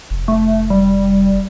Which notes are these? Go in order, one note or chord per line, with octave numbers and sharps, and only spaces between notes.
F1
A3
G3